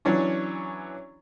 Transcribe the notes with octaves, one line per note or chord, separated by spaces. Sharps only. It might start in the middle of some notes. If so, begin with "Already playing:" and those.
E3 F#3 C#4 D4